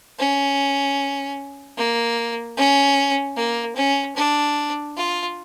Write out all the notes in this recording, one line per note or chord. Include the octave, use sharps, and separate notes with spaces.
C#4
A#3
C#4
A#3
C#4
D4
F4